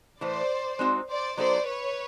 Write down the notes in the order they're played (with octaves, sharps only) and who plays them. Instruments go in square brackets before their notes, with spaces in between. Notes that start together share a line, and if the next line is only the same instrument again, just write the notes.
[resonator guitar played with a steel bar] A2 E3 A3 [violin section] C5 D5
[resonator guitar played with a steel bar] G#3 C4 D#4 F#4
[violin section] C5 D5
[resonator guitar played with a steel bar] F#3 B3 D#4 F#4 A4 [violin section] C5 D5
[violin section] B4 C#5